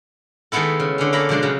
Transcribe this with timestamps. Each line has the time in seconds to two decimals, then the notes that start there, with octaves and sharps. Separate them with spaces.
0.52 D#3 G#3 A3 B3 E4 A4
0.80 C#3
0.98 D3 C#4
1.13 A#3 A4 F5 A#5 B5
1.29 B2 F3 G#3 D4
1.42 C#3 F3 F#3